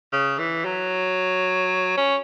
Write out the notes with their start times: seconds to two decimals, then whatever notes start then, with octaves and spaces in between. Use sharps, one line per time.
0.13 C#3
0.39 E3
0.65 F#3
1.97 C#4